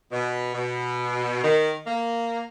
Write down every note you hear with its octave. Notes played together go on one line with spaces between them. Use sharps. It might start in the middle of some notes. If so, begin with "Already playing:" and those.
B2
B2
D#3
A#3